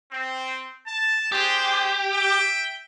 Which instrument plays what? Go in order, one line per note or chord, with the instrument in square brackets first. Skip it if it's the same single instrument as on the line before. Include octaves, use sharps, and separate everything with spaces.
[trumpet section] C4
A5
[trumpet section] D4 G#4 C5 [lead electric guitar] G4
[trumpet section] E5 G5